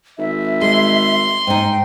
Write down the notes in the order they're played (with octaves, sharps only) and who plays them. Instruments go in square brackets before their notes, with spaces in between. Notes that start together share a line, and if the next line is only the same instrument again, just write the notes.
[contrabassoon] G#1 [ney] E5
[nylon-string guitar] G#3 [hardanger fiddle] C6
[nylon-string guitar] G#2 D#4 [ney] G5